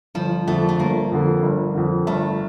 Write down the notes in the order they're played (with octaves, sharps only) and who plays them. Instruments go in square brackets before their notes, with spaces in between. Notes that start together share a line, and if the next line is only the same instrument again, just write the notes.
[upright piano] G1 [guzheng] F3
[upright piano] F2 D3 [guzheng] A3
[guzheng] A3
[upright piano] G1 [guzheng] A#3
[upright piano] F2 D3
G1
F2 D3
[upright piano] G1 [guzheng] A3